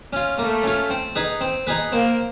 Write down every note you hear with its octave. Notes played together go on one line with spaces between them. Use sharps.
C#4 F4
A3 A#3
C#4 F4
C4
D#4 G#4 B4
C4
D#4 G#4 B4
A#3 C4